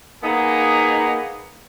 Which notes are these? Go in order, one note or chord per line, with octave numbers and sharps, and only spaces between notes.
A#3 B3 D#4 G#4